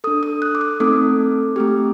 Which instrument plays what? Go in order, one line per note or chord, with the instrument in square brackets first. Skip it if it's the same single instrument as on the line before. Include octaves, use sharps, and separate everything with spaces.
[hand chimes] D4 A4 D#6
D#6
F#6
D6
D#6
A3 C4 D#4 A4 D6
A3 C4 G4